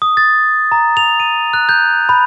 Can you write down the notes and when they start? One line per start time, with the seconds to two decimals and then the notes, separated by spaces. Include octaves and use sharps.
0.02 D#6
0.17 A6
0.72 A#5
0.97 F7
1.20 D#7
1.53 F#6
1.69 G6
2.09 B5